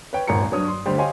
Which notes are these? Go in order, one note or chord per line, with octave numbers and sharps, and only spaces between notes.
B4 C#5 G5
D#1 G#1 C#5 A#5 C#7
G2 F#3 C#5 D#6
C6
D2 D3 G3 C5 C6
G4 C#5 D#5 F5 G#5 C6